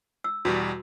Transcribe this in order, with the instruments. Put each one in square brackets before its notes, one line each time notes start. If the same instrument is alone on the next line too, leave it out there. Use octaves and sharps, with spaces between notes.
[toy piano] E6
[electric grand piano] E2 B2 G3 [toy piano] F#4